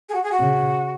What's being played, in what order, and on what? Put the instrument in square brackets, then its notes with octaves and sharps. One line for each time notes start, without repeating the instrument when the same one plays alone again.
[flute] G#4
F#4
G#4
F#4
[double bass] C#3